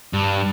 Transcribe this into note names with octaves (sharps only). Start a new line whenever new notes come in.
G2